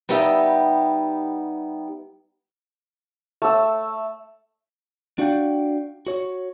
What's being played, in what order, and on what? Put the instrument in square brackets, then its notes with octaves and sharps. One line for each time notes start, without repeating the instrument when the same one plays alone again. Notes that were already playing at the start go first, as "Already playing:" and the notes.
[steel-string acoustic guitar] G3 B3 D#4 G4 E5
[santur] A3 E6
[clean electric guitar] D4 F#4 D5 F5 G5
F#4 C#5